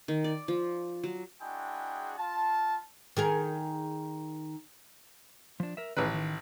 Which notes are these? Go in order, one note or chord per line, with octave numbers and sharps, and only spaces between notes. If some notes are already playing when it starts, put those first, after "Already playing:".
D#3
D5
F3
F#3
G#3 D4 E4 F#4 G#4 G5
F4 A5
D#3 G#4 A#4
F3 D4
A#4 E5
A1 D#3 C#4 G#4 B4
D#3